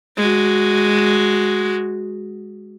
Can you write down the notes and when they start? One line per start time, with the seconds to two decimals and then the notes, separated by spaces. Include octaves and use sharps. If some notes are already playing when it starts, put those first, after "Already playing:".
0.17 G#3 F#4